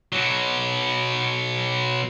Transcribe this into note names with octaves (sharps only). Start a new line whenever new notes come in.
B2 F#3